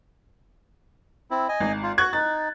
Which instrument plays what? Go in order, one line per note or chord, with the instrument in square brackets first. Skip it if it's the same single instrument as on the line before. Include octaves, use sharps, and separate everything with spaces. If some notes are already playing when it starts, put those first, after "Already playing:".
[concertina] C4 E4
D#5 G#5
[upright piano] G#1
[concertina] F4
[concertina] F#4 [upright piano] C#6 F#6 G#6
[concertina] D#4 [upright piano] A6